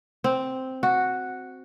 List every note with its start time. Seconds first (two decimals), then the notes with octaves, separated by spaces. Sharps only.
0.24 C4
0.83 F#4